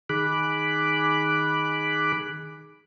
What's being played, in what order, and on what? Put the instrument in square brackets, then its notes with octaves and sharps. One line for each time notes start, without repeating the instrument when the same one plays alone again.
[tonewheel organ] D#3 G#4 B5 D6 F#6